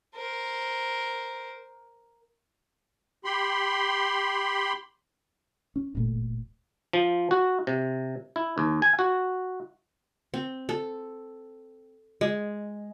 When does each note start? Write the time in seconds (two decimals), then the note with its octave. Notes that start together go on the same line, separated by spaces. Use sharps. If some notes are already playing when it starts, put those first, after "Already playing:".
0.16 A#4 C5
3.25 G4 B5 C6
5.76 C#4
5.95 D1 G1 A#2 A3
6.93 F3
7.31 F#4
7.67 C3
8.36 E4
8.58 D#2
8.82 G#5
8.99 F#4
10.34 C4
10.69 A4
12.21 G#3